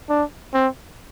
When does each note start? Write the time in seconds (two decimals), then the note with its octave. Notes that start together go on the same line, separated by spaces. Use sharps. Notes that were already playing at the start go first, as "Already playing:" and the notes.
0.09 D4
0.54 C4